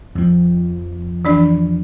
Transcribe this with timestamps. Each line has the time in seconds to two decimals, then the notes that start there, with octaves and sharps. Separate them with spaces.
0.15 F2 F3
1.25 E3 D4 D5